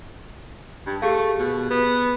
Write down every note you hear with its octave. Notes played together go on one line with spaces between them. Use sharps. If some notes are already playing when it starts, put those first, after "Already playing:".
G2
A3 G4 G#4 F5
B2
B3